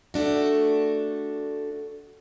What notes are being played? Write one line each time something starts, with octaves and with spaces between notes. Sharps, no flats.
A3 D4 F#4